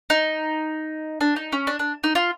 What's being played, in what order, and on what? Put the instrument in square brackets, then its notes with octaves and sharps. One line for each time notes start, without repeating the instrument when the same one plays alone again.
[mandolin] D#4
D4
D#4
C#4
D4
D4
D#4
F4